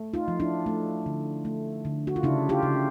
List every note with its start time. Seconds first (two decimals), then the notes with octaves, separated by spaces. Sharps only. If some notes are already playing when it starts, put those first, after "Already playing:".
Already playing: A3
0.14 D#4 F4
0.28 F3
0.40 D4 E4
0.66 A3
1.06 D3
1.45 A3
1.85 D3
2.07 F#4
2.16 F4
2.23 C#3 D4 E4
2.49 F4 G4
2.63 C#3